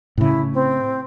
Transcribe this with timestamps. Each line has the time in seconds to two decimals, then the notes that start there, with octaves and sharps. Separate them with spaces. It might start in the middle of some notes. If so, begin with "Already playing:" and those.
0.18 A2 C#3 E4
0.53 C4